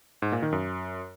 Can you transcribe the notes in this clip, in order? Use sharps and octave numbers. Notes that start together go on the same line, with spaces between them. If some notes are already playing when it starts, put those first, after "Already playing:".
G#2
A#2
D#3
F#2